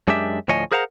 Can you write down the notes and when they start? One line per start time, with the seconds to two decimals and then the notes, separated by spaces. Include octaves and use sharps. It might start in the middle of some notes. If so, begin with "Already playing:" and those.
0.08 F#2 G#3 D4 G4 E5
0.48 D2 A2 F3 C#5 D#5 G#5
0.72 G#4 A#4 C5 F5 F#5 A#5